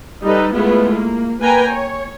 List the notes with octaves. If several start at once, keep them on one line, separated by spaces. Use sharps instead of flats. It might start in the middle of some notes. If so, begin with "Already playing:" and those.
G3 D#4 A4 B4
G#3 A3 B3 E4 F4
A#3
A#3 B4 G5 G#5 A#5
C#5